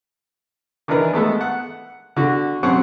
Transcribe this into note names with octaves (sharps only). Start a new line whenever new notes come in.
D#3 E3 D4 E4 A#4 B4
G#3 A3 B3 A4
F#5
D3 F#4
B2 F#3 C4 C#4 F#5 C#6